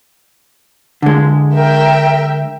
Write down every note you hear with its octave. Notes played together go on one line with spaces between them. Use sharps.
D3 G#3
A#4 E5 G5